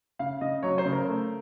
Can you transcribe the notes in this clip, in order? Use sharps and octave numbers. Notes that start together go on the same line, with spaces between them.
C#3 F5
C#3 D#5
F#3 C#5
C5
C#3
A#4
A3